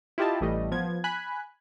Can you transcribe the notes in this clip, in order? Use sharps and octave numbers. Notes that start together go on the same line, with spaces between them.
E4 F4 G4 D#5 A5
A1 E3 G3 A3 D#5
F3 B3 G#6
G#5 B5 F#6